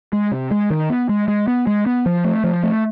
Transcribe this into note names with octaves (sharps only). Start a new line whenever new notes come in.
G#3
C3
G#3
D#3
B3
G#3
G#3
B3
G#3
B3
F3
A3
F3
A3